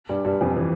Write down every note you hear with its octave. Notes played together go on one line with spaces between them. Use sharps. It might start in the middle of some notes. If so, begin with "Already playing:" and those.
G2 G3
G2 G3
F2 F3
E3